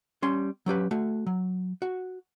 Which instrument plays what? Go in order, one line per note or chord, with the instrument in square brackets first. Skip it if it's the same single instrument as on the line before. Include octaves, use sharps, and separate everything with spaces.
[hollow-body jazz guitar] G3 C#4 C6
F#3 C#4 G4 B4
A3 F#4
F#3
F#4